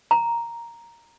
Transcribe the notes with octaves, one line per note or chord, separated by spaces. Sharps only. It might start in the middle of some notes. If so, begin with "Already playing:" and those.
A#5